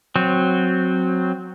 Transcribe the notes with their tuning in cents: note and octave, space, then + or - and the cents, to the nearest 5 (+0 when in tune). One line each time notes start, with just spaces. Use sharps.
F#3 -10 C4 +0